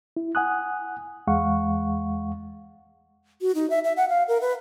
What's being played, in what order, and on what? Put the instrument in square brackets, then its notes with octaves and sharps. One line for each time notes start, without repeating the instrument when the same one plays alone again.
[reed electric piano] E4
F#5 G#5 D#6 F#6
E2 G#3 F5 F#5 C#6
[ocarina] F#4
D#4
E5
E5
F#5
F5
A#4
B4